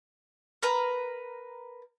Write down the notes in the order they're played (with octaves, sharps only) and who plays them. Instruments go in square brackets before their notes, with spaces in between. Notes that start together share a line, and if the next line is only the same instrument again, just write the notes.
[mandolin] A#4 B4 A#5